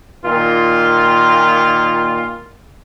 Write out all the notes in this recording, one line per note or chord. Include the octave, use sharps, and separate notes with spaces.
A#2 D#3 F4